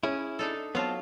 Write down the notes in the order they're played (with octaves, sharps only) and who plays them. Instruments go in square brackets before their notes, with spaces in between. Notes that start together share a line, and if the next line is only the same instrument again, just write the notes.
[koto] C#4 [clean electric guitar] E4 G#4
[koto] D4 D#4 A4
[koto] F#3 F4 [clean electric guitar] B3 C4 A5